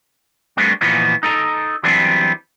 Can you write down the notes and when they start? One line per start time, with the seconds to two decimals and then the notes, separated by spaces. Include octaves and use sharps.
0.57 G3 A3 B3 C4 D4 F#4
0.81 A#2 E3 F3 B3 D#4 F#4
1.23 D#4 A4 A#5
1.83 E3 F#3 G3 B3 C4 D4